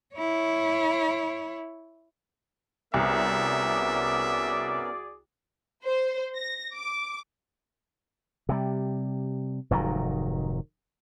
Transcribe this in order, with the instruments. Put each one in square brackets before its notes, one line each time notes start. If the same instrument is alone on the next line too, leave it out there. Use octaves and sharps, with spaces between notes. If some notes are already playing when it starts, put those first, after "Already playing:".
[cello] E4 C#5
[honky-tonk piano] C2 [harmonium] B3 C#4 A#4 [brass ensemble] F#4 G#4 D5 [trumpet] E5
[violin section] C5
A#6
D6
[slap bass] C3 G3
F1 G#2 D#3 F#3